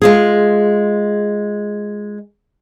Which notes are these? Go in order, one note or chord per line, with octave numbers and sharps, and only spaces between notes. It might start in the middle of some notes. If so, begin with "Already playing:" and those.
G#3 F4 G#4